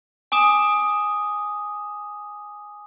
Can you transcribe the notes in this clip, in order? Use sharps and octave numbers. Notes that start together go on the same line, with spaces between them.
G#5 D6 D#6 E7